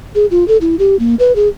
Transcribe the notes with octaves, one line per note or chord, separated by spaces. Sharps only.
G#4
F4
A4
E4
G4
A#3
B4
G#4